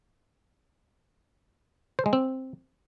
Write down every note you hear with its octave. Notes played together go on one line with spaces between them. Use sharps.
C5
G#3
C4